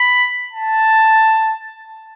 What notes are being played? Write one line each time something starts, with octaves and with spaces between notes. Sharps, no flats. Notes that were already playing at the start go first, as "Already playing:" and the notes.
Already playing: B5
A5